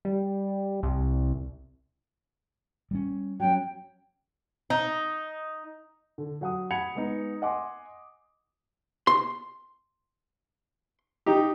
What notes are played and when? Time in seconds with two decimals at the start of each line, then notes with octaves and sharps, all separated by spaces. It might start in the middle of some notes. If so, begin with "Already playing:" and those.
0.05 G3
0.83 C2
2.91 G3 A#3 C#4
3.40 F#3 C#4 G5
4.70 D#4
6.18 D3
6.41 F#3 F#5 D#6
6.71 F#5 B5 G#6 C#7 F7
6.95 G#3 B3 D#4
7.42 D#5 F#5 G#5 C6 D6
9.07 C6
11.26 D#4 G4